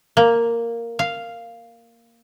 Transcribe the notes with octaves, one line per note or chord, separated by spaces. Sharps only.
A#3
F5